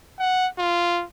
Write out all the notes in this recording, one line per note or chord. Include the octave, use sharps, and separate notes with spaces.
F#5
F4